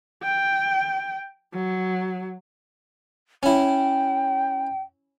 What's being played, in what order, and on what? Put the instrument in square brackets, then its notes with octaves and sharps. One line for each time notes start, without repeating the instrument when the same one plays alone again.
[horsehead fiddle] G5
F#3
[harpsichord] C#4 E4 [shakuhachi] G5